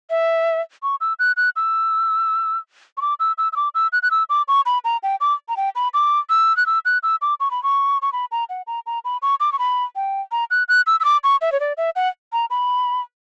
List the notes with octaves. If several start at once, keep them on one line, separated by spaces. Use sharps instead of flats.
E5
C#6
E6
F#6
F#6
E6
C#6
D6
E6
E6
E6
D6
E6
F#6
F#6
E6
D6
C#6
B5
A#5
G5
D6
A#5
G5
B5
D6
E6
F#6
E6
F#6
E6
D6
C#6
B5
C#6
C#6
B5
A#5
F#5
A#5
A#5
B5
C#6
D6
C#6
B5
G5
A#5
F#6
F#6
E6
E6
D6
C#6
E5
C#5
D5
E5
F#5
A#5
B5